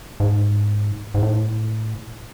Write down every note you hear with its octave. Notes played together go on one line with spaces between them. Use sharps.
G#2
G#2
A2